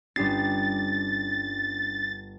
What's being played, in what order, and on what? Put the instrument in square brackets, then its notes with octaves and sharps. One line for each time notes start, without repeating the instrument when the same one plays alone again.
[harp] G1 G4 C7 [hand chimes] C#4 D4 [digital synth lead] A6